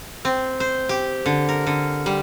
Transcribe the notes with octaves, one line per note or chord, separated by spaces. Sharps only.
C4
C5
G4
D3
A#4
D3
G3